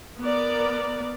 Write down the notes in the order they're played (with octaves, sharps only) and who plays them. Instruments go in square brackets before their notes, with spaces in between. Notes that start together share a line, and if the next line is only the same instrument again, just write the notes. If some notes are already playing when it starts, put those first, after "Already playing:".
[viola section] B3 A#4 D5